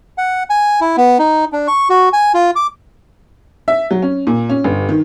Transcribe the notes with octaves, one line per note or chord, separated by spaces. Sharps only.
F#5
G#5
E4
B3
D#4
D4
C#6
F#4
G#5
F4
D6
E5
F#3
C#4
A#2
C#4
G1
D#3